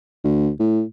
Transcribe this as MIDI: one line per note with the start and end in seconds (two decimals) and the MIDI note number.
0.24 0.50 38
0.60 0.83 45